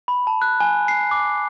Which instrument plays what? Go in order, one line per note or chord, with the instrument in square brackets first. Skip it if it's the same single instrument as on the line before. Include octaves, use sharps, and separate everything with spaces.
[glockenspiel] B5
A5
F#6
G#5
C7
D6